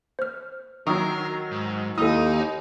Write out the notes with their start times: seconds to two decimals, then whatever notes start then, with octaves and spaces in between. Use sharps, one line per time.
0.19 C5 F6
0.87 D#3 F#3 A#4 C#6 D#6 E6
1.51 G#2
1.98 D#2 D#4 E4 A4 D#6